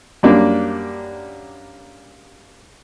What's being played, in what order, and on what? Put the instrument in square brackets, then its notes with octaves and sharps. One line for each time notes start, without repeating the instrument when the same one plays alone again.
[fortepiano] F#2 G3 A#3 D4